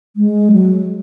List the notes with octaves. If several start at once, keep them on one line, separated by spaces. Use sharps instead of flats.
G#3
F#3